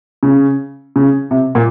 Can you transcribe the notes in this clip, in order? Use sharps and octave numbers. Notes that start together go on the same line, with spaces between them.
C#3
C#3
C3
A#2